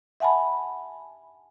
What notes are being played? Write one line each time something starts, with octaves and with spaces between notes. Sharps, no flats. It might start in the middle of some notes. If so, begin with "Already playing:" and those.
E5 F#5 G#5 A5 B5